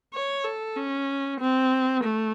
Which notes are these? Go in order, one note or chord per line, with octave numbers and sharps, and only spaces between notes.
C#5
A4
C#4
C4
A3